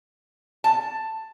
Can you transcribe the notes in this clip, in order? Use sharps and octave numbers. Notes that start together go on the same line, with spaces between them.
A5